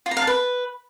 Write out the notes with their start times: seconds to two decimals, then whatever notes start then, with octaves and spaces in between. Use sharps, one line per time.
0.06 F4
0.11 A#5
0.17 F5
0.22 A5
0.27 B4